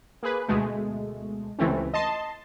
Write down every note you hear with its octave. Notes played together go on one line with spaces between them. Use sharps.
A#3 G#4 B4
D2 B2 G#3 A3
C#2 C3 E3 A3 C4 C#4
D#5 A5 C6